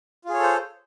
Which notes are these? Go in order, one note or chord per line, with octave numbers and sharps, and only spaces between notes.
F4 G#4 A4 C5 C#5